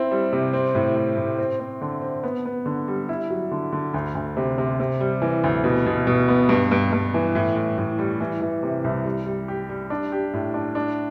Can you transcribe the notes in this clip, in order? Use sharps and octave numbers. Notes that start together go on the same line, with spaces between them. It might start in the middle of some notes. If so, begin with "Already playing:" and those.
Already playing: C4 E4
G3
C3
C4
A2
A2
A2
C4
C4
D3
C4
B3
B3
D3
G3
E4
F#3
D3
D3
D2
D2
C3
C3
C3
G3
E3
D2
B2
B2
B2
B3
G2
G2
G2
E3
A2
A2
A2
G3
E3
E3
C3
C2
G3
G3
G4
G3
D4
G4
A2
D4
D4